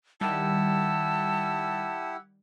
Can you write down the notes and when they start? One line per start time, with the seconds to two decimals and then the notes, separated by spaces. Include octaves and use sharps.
0.21 D#3 G3 E4 G4 F#5 A5 E6